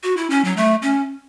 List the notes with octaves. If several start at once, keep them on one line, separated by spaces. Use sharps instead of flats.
F#4
E4
C#4
F#3
A3
C#4